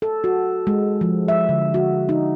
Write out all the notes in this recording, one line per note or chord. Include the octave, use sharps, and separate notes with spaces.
A4
F#4
G#3
F3
E5
D3
F#4
D#4